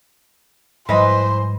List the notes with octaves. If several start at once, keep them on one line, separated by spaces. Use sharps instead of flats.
G#2 E3 F3 G3 B4 C5 D#5 B5